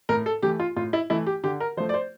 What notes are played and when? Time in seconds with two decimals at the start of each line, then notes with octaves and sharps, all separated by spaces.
0.09 A2 A#4
0.26 A4
0.42 E3 A3 G4
0.60 F4
0.76 A2 F4
0.93 E4
1.10 E3 A3 E4
1.26 G4
1.44 D3 G4
1.60 A#4
1.77 F3 C5
1.80 A3
1.89 D5
1.94 C5